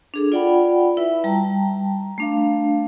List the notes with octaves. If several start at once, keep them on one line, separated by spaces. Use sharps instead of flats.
D4 G#4 A4
F4 D5 F#5 G5 B5
E4 B4 E5
G3 G5 A5 A#5
A3 D4 F5